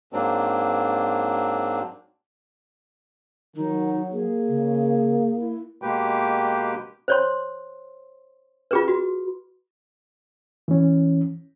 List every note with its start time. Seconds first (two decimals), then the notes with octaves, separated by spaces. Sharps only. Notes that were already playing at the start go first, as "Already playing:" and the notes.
0.13 G#2 F#3 A#3 C4 D4
3.56 D#3 F#3 D#4
4.12 A#3 G#4
4.48 C#3
5.37 E4
5.82 B2 G#3 A#3 G4 B4 G5
7.08 C5 C#5 C6
8.71 F4 G#4 B4
8.88 F#4
10.68 E3 C#4